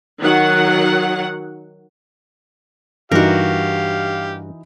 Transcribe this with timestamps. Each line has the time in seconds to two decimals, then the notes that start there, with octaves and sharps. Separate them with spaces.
0.20 D#3 F#3 F#5
3.12 G2 E3 D#4 F#4 G4 A#4 F5